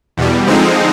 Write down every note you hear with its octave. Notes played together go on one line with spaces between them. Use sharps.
E2 B2 G3
D3 F3 G#3 C4 D#4